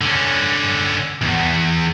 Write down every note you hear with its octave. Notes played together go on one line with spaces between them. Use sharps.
D3 C#4
B1 E2